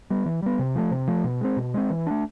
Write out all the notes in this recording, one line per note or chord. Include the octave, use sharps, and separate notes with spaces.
G3 B3
E3
G3 B3
C3
F3 A3
C3
F3 A3
B2
G#3 C4
B2
G#3 C4
E3
A3 D4